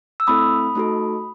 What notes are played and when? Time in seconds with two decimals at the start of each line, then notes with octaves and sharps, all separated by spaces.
0.20 E6
0.27 A3 C4 E4 A4 B5 D#6
0.75 A3 D#4 F#4 A4